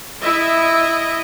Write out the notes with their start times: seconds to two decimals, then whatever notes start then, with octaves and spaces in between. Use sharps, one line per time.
0.22 E4 D#5 E5